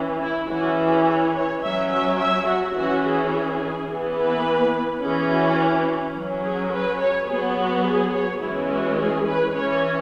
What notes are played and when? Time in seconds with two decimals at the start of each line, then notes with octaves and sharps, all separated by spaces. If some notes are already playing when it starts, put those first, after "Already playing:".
Already playing: E3 C#4
0.21 E4
0.49 E3 C#4 F#4
0.78 G#4
1.05 C#5
1.34 C#5
1.62 F#3 C#4 E5
1.90 E5
2.18 E5
2.47 F#4
2.75 E3 C#4 F#4
3.04 G#4
3.33 G#4
3.89 E3 B3
4.18 B4
5.02 E3 C#4 G#4
5.30 F#4
6.16 F#3 C#4
6.43 G#4
6.73 B4
7.01 C#5
7.29 F#3 B3 G#4
7.57 F#4
7.86 G#4
8.13 C#5
8.42 E3 G#3 C#4 E4
8.70 F#4
8.99 G#4
9.26 B4
9.55 E3 C#4 C#5